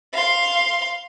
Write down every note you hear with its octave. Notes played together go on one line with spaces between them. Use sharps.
F5 C6